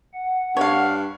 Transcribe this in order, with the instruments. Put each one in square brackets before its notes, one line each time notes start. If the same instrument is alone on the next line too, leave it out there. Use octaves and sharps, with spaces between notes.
[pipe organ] F#5
[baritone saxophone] G2 [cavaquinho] C#5 F5